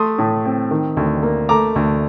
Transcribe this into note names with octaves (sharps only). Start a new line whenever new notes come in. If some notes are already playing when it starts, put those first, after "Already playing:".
Already playing: A3 C6 D#6
A2
C4
D#3
D2
A#3
A3 A#5 D6
D2